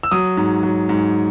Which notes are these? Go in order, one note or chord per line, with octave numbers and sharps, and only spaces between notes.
E6
F#3 D#6
G#2
F#3
G#2